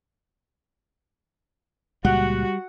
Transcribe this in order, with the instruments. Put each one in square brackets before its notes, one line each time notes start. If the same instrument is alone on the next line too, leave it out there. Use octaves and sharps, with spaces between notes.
[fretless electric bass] C#2 A#2 G#3 [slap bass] G3 [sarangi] F#4 [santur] F#5